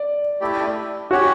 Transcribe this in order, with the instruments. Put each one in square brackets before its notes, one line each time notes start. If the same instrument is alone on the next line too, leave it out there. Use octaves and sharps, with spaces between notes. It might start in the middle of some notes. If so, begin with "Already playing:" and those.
Already playing: [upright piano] D5
[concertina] A3 E4 G4 D5
[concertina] C#4 G4 C#5 F#5 [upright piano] F#4